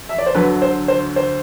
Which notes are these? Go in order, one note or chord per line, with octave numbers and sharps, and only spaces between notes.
E5
D5
C5
D2 D3 F#3 B4
C5
C5
C5